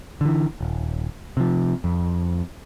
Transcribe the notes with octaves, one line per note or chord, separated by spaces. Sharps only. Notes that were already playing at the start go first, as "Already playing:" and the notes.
D3 E3
D#1
C3 F3
F2